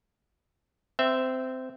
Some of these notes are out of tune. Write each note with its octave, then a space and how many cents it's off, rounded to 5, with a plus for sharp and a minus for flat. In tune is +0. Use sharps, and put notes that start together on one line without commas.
C4 -15 E5 +0